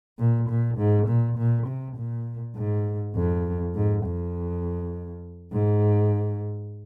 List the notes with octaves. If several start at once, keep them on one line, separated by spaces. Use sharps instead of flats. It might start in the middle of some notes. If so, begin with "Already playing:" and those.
A#2
A#2
G#2
A#2
A#2
C3
A#2
G#2
F2
G#2
F2
G#2